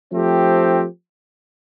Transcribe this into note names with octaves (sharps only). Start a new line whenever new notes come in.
F3 A3 C4 G4